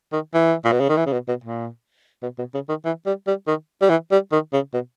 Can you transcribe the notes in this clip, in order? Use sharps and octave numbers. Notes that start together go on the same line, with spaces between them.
D#3
E3
A#2
B2
C#3
D#3
E3
C#3
B2
B2
A#2
B2
B2
C#3
D#3
E3
G3
G3
D#3
G3
E3
G3
D#3
C#3
B2